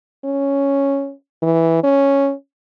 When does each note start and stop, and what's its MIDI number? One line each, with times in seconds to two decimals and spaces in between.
0.25 1.12 61
1.43 1.79 52
1.84 2.33 61